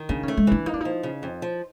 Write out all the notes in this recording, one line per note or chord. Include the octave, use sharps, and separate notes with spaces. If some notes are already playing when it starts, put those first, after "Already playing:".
Already playing: D#3
C#3 D4
C#4
A3
G#3
E3 D4
A#3 D#4
D4
F3 D#4
C#3
F2
F3